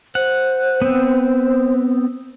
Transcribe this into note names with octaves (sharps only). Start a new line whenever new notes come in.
C5 F#5
B3 C4